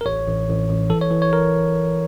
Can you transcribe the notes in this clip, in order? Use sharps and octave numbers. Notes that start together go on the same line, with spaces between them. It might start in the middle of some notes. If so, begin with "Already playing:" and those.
A#4
A1 C#5
A1
A1
A1
E3 A4
C#5
E3
C#5
A#4